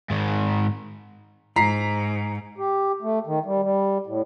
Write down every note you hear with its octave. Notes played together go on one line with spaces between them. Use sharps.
G#2 D#3
G#2 A#5 B6 C7
G4
A3
D#3
G3
G3
A2